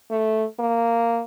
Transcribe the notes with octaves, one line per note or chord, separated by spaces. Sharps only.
A3
A#3